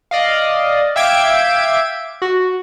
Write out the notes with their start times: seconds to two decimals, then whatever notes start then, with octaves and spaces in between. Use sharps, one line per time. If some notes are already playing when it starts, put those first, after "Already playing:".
0.11 D5 D#5 F5
0.96 E5 F5 G5 D6 G#6 D7
2.22 F#4